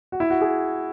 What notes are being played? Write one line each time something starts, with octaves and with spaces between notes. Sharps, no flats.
F#4
E4
F#4
G#4